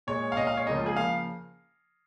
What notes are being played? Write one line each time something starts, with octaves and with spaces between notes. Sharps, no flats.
A#2 G#3 C#5
F5
A#2 G#3 D#5
F5
C#5
C#2 C#3 F3 A#3 D#5
F4
G#4
C#3 F3 A#3 F5